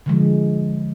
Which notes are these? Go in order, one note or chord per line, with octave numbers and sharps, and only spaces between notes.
D3 F3 G#3